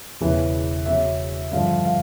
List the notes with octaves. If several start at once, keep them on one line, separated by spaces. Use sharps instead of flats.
E1 E2 C#3 E3
E2 C#3 F#3 E5
G2 D3 F3 F5
F5